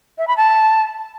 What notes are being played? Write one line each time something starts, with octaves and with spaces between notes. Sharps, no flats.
E5
B5
A5